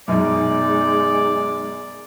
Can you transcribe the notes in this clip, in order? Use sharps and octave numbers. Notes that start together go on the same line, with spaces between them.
F#2 B2 G#3 D#4 D5 D#5